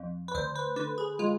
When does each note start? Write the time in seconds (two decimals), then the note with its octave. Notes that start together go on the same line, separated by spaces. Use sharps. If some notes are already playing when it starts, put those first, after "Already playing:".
Already playing: F2
0.28 B4
0.35 D2 C5
0.55 B4
0.76 D3 B4
0.98 G#4
1.19 G#3 F4